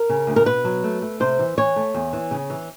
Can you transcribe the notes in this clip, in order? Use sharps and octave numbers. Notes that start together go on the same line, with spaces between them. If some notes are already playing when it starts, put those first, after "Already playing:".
Already playing: A#4
C#3
D2
A#4
B2 B4
F#3
A3
A3
C3 C5
E3
E3 C#5
A3
E2
E3
C#3
E3